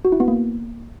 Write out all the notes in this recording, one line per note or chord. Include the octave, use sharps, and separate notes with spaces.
F#4
E4
B3
A#3